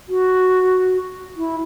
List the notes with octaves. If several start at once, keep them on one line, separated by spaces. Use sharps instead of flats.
F#4
E4